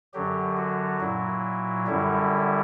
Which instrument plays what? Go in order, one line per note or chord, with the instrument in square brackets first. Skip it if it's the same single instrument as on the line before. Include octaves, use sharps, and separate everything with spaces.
[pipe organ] F#2 D3 F#3 G4
F#4
A#2 F#3 E4
F#2 D3 G3 E4